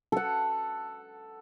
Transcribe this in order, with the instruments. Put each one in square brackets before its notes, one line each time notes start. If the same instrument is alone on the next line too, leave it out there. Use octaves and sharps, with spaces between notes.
[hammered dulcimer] A4 F#5